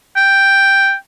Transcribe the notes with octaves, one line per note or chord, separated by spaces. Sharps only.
G5